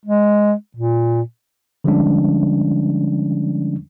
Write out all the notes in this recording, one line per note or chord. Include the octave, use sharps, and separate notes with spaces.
G#3
A#2
D3 F3 G3 G#3 C#4 D4